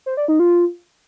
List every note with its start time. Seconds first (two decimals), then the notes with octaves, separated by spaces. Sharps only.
0.06 C5
0.17 D5
0.28 D#4
0.39 F4